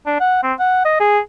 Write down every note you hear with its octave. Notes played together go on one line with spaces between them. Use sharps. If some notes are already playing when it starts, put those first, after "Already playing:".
D4
F#5
C4
F#5
D#5
G#4